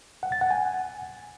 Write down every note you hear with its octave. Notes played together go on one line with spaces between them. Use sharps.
F#5
A6
F#5
G#5